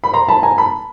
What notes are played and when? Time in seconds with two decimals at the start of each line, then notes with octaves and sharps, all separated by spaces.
0.04 B5
0.14 A#5 C6
0.28 A5 B5
0.43 G#5 A#5
0.58 A5 B5